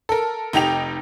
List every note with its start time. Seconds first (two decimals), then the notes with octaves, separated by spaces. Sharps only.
0.09 A4 A#4
0.53 F1 D#4 G4 G5 F7